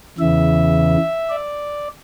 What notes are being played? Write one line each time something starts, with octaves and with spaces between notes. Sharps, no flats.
E2 C#3 E3 E5
D5